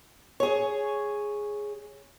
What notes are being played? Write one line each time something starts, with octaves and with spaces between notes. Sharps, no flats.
G#4 C#5